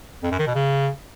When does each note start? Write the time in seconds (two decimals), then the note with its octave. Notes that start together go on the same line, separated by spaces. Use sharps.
0.23 F2
0.31 F#2
0.39 D#3
0.47 B2
0.55 C#3